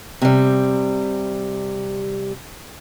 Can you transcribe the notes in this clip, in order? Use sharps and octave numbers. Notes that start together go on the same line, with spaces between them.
C3 G3